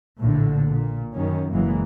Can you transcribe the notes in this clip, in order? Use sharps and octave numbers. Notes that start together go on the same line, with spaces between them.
A#1 A2 D3
A#2
F#2 D#3 C#4
F#1 E3 F#3 G#3 A#3